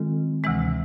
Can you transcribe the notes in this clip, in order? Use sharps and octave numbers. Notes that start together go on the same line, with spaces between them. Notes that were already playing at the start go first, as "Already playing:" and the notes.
Already playing: D#3 G#3 C4 F4 A4
D2 C3 E3 G#3